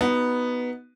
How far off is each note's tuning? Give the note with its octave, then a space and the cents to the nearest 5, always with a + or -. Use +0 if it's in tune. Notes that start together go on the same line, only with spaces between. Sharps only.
B3 +0 D#4 +10 F#4 +10